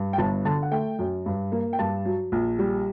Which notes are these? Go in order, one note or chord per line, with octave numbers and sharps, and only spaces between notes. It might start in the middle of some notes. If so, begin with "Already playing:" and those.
Already playing: G2
G5
G1 A5
D3 A5
F#5
A3 G5
F#2
G2
A#3
G5
G2 A5
F#3
A#1
G3